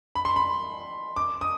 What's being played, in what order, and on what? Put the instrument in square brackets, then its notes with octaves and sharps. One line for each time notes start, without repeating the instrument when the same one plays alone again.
[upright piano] B5
C6
B5
D6
D#6